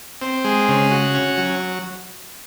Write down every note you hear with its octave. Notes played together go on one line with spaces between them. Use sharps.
C4
G#3
C#3
F#4
C#4
F#3